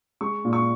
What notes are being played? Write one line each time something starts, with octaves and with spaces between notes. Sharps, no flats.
G#3 C#6
A#2
C#6